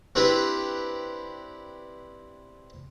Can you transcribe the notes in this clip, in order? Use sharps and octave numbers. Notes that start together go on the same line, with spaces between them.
C4 D4 E4 G4 B4